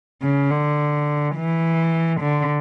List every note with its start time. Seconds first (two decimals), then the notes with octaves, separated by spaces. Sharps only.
0.22 C#3
0.51 D3
1.36 E3
2.21 D3